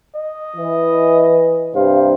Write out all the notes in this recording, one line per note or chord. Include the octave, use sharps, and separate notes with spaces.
D#5
E3
G2 C3 C5 F5